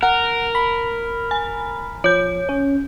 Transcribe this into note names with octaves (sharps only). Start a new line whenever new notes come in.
A#4 F#5
B5
G#5
F3 C#5 G6
C#4